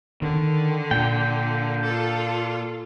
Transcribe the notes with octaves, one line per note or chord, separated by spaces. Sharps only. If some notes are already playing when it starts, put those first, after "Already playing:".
D3 D#3
A#2 G5
F4 A4